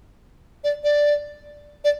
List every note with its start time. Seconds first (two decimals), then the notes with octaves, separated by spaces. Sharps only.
0.64 D5
0.84 D5
1.84 D5